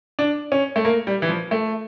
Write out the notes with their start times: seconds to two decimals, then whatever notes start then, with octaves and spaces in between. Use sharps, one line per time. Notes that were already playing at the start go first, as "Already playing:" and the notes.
0.19 D4
0.52 C#4
0.76 A3
0.85 A#3
1.07 G3
1.22 E3
1.29 F3
1.51 A3